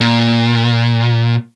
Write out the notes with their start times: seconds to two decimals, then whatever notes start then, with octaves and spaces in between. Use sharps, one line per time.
0.01 A#2